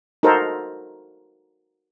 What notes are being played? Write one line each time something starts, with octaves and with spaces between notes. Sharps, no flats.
D#4 F#4 A4 A#4 C5